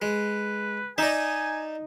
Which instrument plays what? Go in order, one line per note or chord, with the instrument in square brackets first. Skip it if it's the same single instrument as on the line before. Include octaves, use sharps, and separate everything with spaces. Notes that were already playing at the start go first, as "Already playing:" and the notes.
[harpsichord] G#3 [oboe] B4
[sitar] D#4 [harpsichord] D5 E5 [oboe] G#5